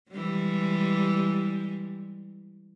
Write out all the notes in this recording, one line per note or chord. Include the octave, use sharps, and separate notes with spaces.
E3 G3 G#3